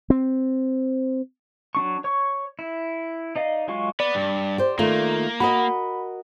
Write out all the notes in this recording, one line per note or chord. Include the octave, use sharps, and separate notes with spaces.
C4
F#3 D4 C#6
C#5 C#6
E4
D#4 D5 D#5 F5
F#3 G#3 F4 F5 C#6
B3 B4 D5
G2
G4 C5
D#3 A3 A#3 F4
F#4 A#4 D#5 B5